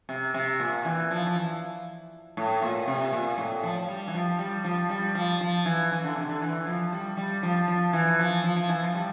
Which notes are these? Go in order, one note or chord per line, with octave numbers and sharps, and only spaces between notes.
C3
C3
A#2
E3
F3
F3
E3
A2
A#2
C3
A#2
A2
F3
F3
G3
E3
F3
G3
F3
G3
F3
F3
E3
E3
D3
C3
D3
E3
F3
G3
G3
F3
F3
E3
F3
F3
F3
E3
F3
G3